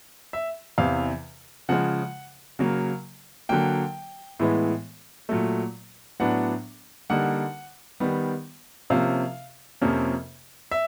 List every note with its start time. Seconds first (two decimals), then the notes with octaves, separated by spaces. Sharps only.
0.33 E5
0.78 E2 C3 E3 F5
1.69 C#3 F3 G#3 F#5
2.59 C#3 F#3 A#3
3.49 D3 F#3 A#3 G5
4.40 A2 E3 G#3 B3
5.29 A#2 F#3 A3
6.20 A2 F#3 B3 D4 F#5
7.10 D3 G3 A#3 D#4 F#5
8.00 D#3 G3 B3
8.90 C3 F3 A#3 C#4 F5
9.81 F2 C3 F3 A#3 C#4
10.71 E5